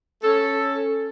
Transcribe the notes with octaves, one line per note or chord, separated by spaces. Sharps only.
C#4 A4